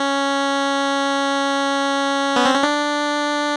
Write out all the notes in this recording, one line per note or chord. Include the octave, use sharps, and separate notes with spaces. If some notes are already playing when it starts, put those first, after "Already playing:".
Already playing: C#4
B3
C4
C#4
D4